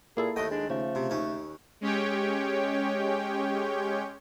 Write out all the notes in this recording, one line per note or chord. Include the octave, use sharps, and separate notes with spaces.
A#2 A#3 E4 G#4 A4
D#2 A3 D#5 G5
G#3 D4
C#3 F3 A3
C3
D#2 C#4
G#3 C#4 G4 C#5 G5